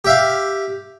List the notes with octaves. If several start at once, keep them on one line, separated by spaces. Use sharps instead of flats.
G4 E5 F5